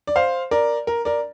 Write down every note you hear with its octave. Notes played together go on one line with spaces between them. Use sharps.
D5
C5 F5
A#4 D5
A#4
A#4 D5